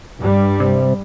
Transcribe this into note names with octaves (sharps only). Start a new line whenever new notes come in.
G2 G3
C3